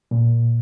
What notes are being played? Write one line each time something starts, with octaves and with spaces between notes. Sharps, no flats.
A#2